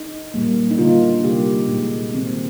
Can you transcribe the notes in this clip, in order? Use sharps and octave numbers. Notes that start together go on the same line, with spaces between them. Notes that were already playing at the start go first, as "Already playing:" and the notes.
Already playing: D#4
A#2 G3 A#3
D#4
D3 G3 A#3 F4
C3 G3 A#3 G4
A#2 G#3 D#4
D#3 A#3 C4